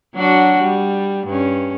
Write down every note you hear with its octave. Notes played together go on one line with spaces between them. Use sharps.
F#3 D4 F#4
G3
G2 C#4